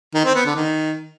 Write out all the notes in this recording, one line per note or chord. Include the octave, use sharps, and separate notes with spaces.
D#3
C4
B3
D3
D#3